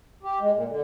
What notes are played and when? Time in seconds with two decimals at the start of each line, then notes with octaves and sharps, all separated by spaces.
0.23 G4
0.41 G#3
0.54 A#2
0.69 D3